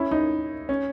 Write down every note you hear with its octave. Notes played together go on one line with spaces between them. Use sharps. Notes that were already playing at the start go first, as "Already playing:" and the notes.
Already playing: C#4 E4
D#4
C#4